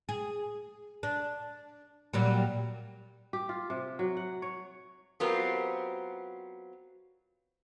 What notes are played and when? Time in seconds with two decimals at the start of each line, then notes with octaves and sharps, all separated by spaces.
0.09 G#4
1.03 D4
2.13 A#2 F#3 G3
3.33 G4
3.49 F4
3.70 C3
3.99 F#3
4.17 F#5
4.42 C#5
5.20 F#3 B3 C4 F4 G4 A#4